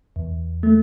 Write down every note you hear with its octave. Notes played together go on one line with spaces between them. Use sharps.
E2
A3